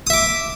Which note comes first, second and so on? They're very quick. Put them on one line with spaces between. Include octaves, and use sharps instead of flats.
D#6 E5 D6